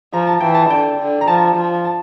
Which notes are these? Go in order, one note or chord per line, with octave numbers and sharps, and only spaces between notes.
F3 A#5
A5
E3 G5
A5
D3 G5
D3
A#5
F3 A5
F3
A5